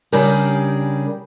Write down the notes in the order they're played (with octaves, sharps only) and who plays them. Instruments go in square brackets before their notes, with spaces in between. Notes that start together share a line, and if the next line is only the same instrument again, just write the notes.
[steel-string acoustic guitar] C#3 G3 D4 G4 G#4 A#4